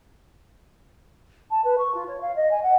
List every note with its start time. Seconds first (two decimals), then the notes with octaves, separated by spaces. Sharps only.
1.51 A5
1.64 B4
1.78 C#6
1.94 F4
2.08 C#5
2.21 F5
2.36 D#5
2.51 G#5
2.63 F#5